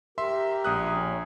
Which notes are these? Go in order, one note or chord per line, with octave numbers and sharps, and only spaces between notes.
G4 A#4 E5 C6
A#1 D#6 F#6
C#4